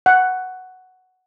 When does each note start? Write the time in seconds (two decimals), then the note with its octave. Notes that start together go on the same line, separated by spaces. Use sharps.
0.06 F#5